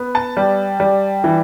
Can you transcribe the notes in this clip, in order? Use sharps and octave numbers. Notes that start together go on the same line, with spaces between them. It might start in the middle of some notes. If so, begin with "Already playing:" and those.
Already playing: B3
A5
G3
G3
E3